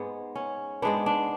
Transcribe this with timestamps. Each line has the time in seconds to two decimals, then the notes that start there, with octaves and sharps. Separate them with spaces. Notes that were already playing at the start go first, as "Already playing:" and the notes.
Already playing: G#2 G#3 B3
0.35 C#4
0.82 G#2 G#3 B3 D4
1.06 D4